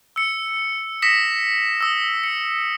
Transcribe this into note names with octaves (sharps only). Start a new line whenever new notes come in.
E6 C#7
D#6 A#6 B6 C#7 E7
D#6 E6
C#7